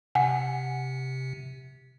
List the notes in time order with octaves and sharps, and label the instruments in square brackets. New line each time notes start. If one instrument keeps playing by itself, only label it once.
[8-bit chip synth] C3 [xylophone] F#5 G#5